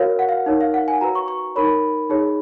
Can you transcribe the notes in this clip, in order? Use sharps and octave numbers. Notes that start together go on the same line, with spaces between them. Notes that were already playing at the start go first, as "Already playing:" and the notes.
Already playing: F#4 A#4 C#5 F5
F#5
F5
D#4 A#4 C#5
F5
F#5
G#5
F#4 B4 A#5
C#6
C#6
D#4 A#4 C#5 B5
D#4 G#4 C#5